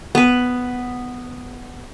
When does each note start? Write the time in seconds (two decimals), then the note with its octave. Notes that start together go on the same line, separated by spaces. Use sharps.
0.15 B3 B4